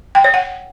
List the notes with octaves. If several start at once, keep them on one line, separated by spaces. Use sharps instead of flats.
G5
C#5
F#5